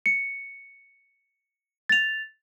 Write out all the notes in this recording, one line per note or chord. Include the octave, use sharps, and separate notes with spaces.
C#7
A6 F7